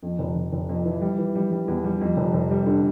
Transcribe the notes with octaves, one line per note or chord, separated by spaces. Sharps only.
F2
F1
F1
F1
F2
E3
G3
E3
G3
G3
E2
G3
F2
F1
F1
G3
D3